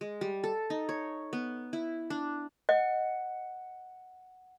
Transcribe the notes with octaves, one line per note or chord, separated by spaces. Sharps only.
G#3
G3
A4
D#4
C#5
B3
E4
D4
D#5 F#5